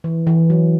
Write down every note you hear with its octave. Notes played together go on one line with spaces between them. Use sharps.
E3
E3
F#3